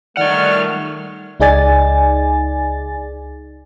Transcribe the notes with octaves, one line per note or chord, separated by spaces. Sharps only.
D#3 G3 A3 D#4 D5 F#5 C#6 F6
C#2 D#4 G#4 D5 G#5 A6